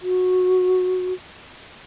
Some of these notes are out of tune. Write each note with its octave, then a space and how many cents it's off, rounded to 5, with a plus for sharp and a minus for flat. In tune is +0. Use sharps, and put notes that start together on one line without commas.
F#4 -15